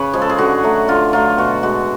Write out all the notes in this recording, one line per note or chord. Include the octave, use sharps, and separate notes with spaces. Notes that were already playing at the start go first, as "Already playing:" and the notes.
Already playing: C#3 B4 C#5
F3 G#3 G#4
A4
G#4
D3 F#4
F#3 A3
D3 F4
F#3 A3 F4
B2 F#4
G#3 F#4